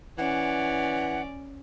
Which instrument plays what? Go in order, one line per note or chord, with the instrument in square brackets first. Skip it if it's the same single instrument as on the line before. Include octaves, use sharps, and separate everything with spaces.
[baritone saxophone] E3 [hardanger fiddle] C#4 D5 [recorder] F#5